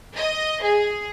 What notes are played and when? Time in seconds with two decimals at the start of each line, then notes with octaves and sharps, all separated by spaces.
0.16 D#5
0.63 G#4